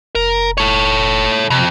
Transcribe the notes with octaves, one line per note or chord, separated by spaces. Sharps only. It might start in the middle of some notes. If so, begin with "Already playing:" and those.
F1 A#4
A4 C#5
F2 C3